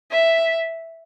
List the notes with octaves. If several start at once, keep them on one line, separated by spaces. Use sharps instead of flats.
E5